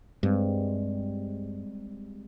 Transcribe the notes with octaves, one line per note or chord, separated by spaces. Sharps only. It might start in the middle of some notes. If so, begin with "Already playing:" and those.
G2 G3 G#3 C4